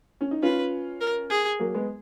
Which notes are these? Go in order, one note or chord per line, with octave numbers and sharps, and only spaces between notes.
C#4
D#4
C#4 F4 B4
A#4
G#4
F#3 A#3
G#3 B3